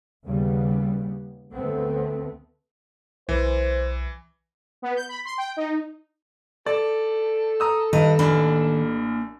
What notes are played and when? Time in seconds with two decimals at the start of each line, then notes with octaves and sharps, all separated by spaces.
0.25 D#2 C#3 G3 B3
1.53 D2 A3 B3 C4
3.29 B1 E3 C5
4.82 B3
4.96 G6
5.08 B5
5.25 C6
5.38 G5
5.57 D#4
6.66 A4 D5
7.60 A#5 D#6 E6
7.93 G2 D#3 D#5
8.19 A1 A#3 D4 B5